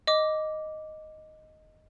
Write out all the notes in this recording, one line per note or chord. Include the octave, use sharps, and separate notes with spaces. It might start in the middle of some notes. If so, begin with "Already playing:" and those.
D#5 D6